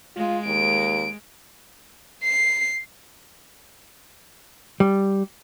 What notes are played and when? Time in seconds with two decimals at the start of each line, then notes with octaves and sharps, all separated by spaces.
0.17 G#3 F4
0.46 D#2 D7
2.24 C7
4.80 G3